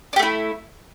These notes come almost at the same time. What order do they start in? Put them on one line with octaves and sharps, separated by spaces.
D4 G4 A3 E4